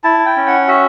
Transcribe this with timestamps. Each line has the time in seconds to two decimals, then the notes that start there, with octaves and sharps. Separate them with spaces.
0.04 E4 A5
0.26 G5
0.37 C#4
0.47 F#5
0.68 F#4 E5